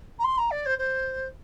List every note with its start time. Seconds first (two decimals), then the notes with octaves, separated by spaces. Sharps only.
0.19 A#5
0.24 C6
0.38 A#5
0.51 D5
0.65 C5
0.78 C5